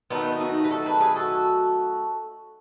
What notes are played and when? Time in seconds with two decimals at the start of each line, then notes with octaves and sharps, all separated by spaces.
0.10 D#3 F#3 A3 B3 D#4
0.40 D#4 F#4
0.64 B4
0.71 F#4 A4
0.86 G#4 B4
1.00 G#4 B4
1.16 F#4 A4